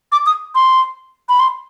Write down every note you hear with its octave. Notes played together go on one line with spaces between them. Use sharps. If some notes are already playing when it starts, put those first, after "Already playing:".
D6
D#6
C6
B5
C6